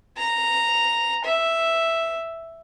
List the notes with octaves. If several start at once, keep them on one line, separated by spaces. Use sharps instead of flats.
A#5
E5